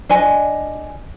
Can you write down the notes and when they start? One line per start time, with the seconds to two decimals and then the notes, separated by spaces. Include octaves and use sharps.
0.09 D4 D#5 G#5